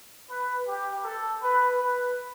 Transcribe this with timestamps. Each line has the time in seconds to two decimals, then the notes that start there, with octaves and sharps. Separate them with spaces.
0.30 B4
0.68 G4
1.04 A4
1.42 B4
1.79 B4